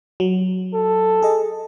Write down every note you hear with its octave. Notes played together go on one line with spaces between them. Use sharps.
F#3
A4
G#4 D#5